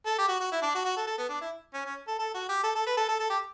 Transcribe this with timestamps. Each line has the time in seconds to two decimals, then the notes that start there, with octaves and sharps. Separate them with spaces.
0.06 A4
0.19 G4
0.29 F#4
0.41 F#4
0.52 E4
0.62 D4
0.75 F#4
0.85 F#4
0.97 A4
1.07 A4
1.18 B3
1.29 D4
1.42 E4
1.74 C#4
1.86 C#4
2.08 A4
2.19 A4
2.34 F#4
2.49 G4
2.64 A4
2.75 A4
2.87 B4
2.97 A4
3.09 A4
3.20 A4
3.30 G4